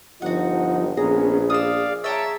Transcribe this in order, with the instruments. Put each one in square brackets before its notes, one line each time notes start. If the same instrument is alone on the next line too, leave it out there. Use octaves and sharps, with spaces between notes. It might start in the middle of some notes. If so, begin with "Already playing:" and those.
[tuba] G1 [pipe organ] F3 D#4 [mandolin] F#4 F#5
[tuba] A#1 [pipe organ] B3 C#4 [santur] G#4 [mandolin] A#5
[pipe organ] D5 F5 [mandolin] D#6 E6
[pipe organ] C#5 A5 [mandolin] E5 G5 A#5